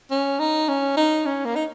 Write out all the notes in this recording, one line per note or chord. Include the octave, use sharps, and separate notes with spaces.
C#4
D#4
C#4
D#4
C#4
A#3
D#4